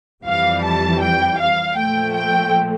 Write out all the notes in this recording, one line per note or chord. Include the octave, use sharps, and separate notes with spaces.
F2 E3 G3 F5
A5
G5
F5
A#2 F3 A3 G5
G5